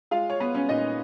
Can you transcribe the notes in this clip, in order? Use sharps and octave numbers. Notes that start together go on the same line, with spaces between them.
G#3 F4 F5
C#5
B3 B4
C#4 C#5
A#2 D#4 D#5